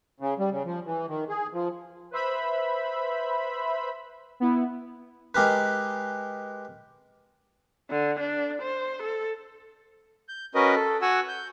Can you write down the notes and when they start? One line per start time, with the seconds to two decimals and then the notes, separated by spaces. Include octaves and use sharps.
0.20 C#3
0.39 G3
0.51 C#3
0.65 F3
0.85 E3
1.08 D#3
1.29 G#4
1.54 F3
2.11 B4 C5 E5 B5
4.40 B3 E4
5.35 G#3 G4 A#4 B4
7.91 D3
8.20 D4
8.62 C5
9.03 A4
10.29 G6
10.55 C#4 F#4 A#4 B4 D#5
10.75 A4
11.02 F#4 F#5 G#5 E6
11.28 G6